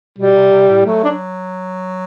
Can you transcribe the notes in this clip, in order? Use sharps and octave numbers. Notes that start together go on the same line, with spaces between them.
B2 G3
C3
C3
A2
F#3 A3
D4